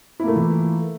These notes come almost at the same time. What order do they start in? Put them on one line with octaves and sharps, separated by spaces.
E4 A#3 A3 F4 E3